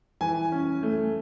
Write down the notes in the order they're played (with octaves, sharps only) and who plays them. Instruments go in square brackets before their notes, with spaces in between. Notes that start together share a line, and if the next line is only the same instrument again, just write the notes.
[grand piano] E3 G#5
C#4
A3